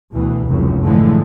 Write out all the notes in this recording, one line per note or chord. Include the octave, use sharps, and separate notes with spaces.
D2 B2 E3
F1 C#2 F#2
A2 D3 E3 F3 G#3 A3